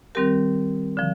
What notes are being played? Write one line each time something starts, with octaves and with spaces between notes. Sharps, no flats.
D#3 G3 C4 G4 A#4
D3 F3